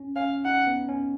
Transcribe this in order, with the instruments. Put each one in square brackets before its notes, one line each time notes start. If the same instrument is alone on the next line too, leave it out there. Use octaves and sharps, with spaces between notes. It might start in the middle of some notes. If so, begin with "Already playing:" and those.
Already playing: [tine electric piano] C#4
[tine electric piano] C#4 [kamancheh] F5
[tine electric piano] D#4 [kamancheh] F#5
[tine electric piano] B3
C#4